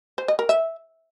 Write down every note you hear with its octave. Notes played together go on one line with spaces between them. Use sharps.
C5
D#5
A#4
E5